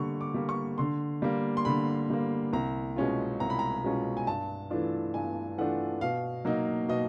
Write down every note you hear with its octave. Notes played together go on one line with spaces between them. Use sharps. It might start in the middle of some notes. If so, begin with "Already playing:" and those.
Already playing: D3 G3 A#3 C#6
D6
G3 A#3
C#6
D3 C6
G3 A#3
C6
D3 B5
G3 A#3
C2 A#5
B2 G#3 C#4 F4
C2 A#5
B5
A#5
B2 G#3 C#4 F4
G#5
G2 A5
E3 A3 D4 F4
G2 G#5
E3 A3 D4 F4 F#5
B2 F5
F#3 A#3 D#4
B2 D#5